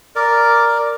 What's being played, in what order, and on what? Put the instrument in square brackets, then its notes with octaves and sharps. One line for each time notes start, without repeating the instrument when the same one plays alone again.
[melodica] A#4 D5